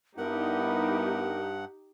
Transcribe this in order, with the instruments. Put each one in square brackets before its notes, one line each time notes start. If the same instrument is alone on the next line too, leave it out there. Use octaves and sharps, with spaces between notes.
[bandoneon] G2 F#5 [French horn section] G3 B3 E4 [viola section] D#4 G4 [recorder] A#4